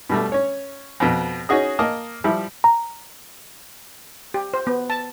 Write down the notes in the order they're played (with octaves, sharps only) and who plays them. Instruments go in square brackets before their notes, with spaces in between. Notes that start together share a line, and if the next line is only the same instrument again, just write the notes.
[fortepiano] B2 G3 A3
C#4 C#5
F2 B2
C#4 D#4 F#4 G#4 D#5
A#3 D#5 A5
F3 G3 E4
[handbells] A#5
[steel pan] G4
C5
B3
A5